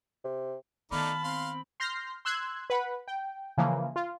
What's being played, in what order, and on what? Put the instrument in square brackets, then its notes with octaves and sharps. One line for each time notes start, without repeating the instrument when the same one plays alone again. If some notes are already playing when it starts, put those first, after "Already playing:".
[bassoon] C3
[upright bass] D#3 B3 [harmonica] A3 D#4 D5 [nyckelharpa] F5 A5 [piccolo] B5
[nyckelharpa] C4 [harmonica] F5 C6
[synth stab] C6 F6 G6 A#6 C7
C6 E6 F#6 G#6
B4 F#5 B5
G5
C#3 E3 F3 A#3
F4